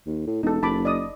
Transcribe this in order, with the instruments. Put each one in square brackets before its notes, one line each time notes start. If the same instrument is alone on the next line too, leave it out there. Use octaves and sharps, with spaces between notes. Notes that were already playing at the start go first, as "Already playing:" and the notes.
[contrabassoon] D#2
A2
[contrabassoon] E1 [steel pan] D#4 A4
[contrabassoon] F#1 [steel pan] A5 B5 D6
[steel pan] D5 D#5 D#6